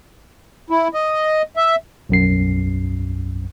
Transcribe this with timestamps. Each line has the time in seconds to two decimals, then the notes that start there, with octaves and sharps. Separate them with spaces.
0.70 E4
0.94 D#5
1.57 E5
2.09 B1 F#2 C7